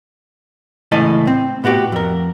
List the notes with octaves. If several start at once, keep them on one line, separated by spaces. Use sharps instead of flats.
C#2 A2 E3 D#5 G#5 A5
C4
A2 B3 F#4 G4
F2 A#4